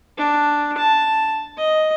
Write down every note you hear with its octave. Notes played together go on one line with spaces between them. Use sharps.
D4
A5
D#5